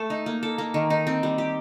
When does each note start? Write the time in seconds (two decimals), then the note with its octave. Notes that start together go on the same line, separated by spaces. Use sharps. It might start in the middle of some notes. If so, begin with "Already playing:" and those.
Already playing: A3 A4
0.10 D#4
0.26 A#3
0.43 A4
0.58 A#3
0.74 D#3
0.90 D#4
1.07 C4
1.23 G3
1.38 G4